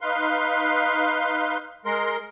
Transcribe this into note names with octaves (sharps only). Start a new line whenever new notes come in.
D#4 B4 F5 C6
G#3 A#4 C6